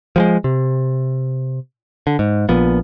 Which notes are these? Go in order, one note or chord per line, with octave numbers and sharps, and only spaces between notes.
F3 G3 G#3
C3
D3
G#2
A#1 A#2 F3 B3